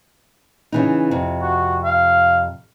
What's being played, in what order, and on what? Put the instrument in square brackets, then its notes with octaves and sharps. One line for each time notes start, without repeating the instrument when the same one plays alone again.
[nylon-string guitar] C#3 E3 D#4
F2 C3
[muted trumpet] F#4
F5